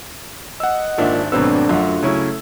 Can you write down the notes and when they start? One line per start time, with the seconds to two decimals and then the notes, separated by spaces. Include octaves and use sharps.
0.60 D#5 F#5 E6
0.98 G#1 A#2 D4 E5
1.32 G#1 D2 B2 F#3 B3 C4 D4 E6
1.69 F#2 F4 F#5
2.03 C#3 F#3 A3 C#4 E4